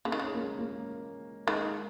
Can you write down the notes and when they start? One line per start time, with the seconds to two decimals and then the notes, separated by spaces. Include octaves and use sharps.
0.05 C#3 A#3
0.12 D#3
0.20 C#3 C#4
0.34 A#3
0.41 G#3
0.59 A#3
1.47 D#3 G#3